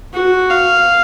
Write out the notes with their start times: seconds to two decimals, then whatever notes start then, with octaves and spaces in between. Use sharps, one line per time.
0.14 F#4
0.51 F5